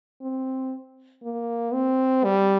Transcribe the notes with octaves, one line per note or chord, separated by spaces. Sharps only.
C4
A#3
C4
G3